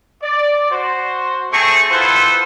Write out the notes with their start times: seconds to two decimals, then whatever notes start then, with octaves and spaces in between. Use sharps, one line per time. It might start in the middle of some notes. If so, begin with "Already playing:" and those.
0.23 D5
0.70 F#4 C5
1.52 A3 C4 G#4 A5 C#6
1.90 E4 F4 A4 B4 C5 F#5